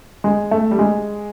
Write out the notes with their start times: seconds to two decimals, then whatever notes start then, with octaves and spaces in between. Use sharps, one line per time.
0.24 G#3
0.51 A3
0.71 G3
0.79 G#3